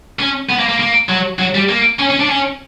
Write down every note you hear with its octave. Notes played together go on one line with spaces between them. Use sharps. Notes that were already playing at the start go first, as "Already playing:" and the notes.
C#4
B3
A#3
A#3
A#3
F#3
F#3
G3
A#3
C#4
C#4
D4
C#4